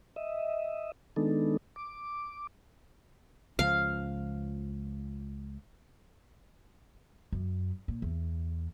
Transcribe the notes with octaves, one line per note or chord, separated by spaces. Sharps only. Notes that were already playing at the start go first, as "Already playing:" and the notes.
D#5 E5
D#3 G#3 B3 D4 D#4 A4
D6
C#2 F3 F5
F#2
A#2
E2